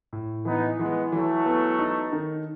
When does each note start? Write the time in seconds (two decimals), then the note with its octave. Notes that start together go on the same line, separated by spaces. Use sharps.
0.13 A2
0.45 E3 B3 D#4
0.79 E3 G#3 B3
1.12 E3 F#3 A3
1.46 B3
1.79 D#4
2.12 D#3